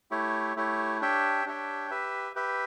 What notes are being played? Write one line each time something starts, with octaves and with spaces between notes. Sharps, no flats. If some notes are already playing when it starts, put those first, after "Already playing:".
A3 E4 G4 C#5
A3 E4 G4 C#5
D4 G4 C#5 E5 G5
D4 G4 C#5 E5 G5
G4 B4 E5
G4 B4 E5